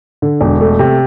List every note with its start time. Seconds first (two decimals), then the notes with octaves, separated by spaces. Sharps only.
0.22 D3
0.41 E1
0.61 A3
0.79 C3